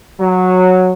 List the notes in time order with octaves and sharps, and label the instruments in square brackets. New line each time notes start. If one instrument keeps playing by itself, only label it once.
[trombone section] F#3